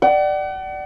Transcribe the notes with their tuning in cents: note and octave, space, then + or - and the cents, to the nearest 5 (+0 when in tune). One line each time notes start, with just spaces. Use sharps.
D5 +15 F#5 +40